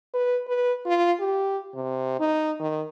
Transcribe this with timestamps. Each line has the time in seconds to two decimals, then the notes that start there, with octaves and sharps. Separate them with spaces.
0.14 B4
0.47 B4
0.86 F4
1.20 G4
1.75 C3
2.19 D#4
2.59 D#3